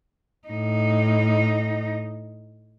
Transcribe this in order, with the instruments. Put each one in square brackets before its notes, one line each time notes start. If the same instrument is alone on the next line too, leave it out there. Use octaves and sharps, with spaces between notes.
[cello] A2 D#4